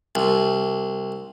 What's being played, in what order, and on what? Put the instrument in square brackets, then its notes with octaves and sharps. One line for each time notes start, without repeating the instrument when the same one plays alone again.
[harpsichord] C2